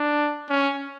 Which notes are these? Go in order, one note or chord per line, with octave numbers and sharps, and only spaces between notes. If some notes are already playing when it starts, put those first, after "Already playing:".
Already playing: D4
C#4